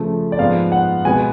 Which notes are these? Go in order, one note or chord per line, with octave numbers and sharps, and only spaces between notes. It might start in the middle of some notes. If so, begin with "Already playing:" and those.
Already playing: C#3 F3 A3
D5
G#2 F3 B3 F5
F#5
B2 G#3 B3 G#5